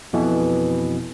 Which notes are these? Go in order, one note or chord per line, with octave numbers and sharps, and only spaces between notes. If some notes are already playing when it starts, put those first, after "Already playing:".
F2 B2 E3